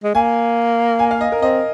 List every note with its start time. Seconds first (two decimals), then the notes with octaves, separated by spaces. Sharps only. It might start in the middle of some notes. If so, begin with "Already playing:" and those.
0.04 G#3
0.14 A#3 G#5
0.99 G#5
1.11 F5
1.21 D#5
1.32 A#4
1.42 C4 D#5